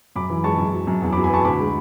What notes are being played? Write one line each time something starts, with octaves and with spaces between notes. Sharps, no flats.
F#2 B5 D6
E3
G#3 A5 C#6
F#2
F#3
F#2
E2
F#3 B5 D6
G#5 B5
B3 A5 C#6
D2 B5 D6
G#3